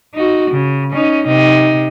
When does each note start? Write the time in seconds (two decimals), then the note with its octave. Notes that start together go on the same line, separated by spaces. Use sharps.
0.14 D#4 F#4
0.50 C#3
0.91 C#4 D#4
1.26 C3 D#4